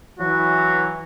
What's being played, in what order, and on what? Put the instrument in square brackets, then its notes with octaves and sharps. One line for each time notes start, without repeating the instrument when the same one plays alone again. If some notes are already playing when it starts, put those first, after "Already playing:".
[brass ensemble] E3 F#3 [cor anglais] F#4